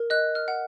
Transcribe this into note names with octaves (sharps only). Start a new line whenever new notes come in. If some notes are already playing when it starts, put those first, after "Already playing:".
Already playing: A#4
D#5 F#6
F6
F#5